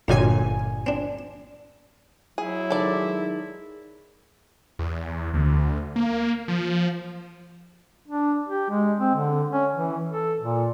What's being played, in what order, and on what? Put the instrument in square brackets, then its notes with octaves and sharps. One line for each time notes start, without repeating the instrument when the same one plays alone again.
[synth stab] G1 A#2 G#5 [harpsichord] F2 F#3 G3
[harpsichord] C4 D4
[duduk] F#3 [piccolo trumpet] E4 [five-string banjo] G#4
[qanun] D#3 G#3 G#4 [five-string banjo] A4 D5
[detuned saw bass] E2
D2
A#3
F3
[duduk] D4
G4
G#3
C4
D3
C#4
E3
A4
A#2